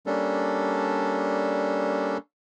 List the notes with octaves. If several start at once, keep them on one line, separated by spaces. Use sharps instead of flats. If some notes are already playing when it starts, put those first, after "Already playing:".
G3 A#3 C#4 D4 A4